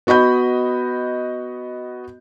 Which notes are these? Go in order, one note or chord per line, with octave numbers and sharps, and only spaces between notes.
B3 F#4 D#5 B5 G6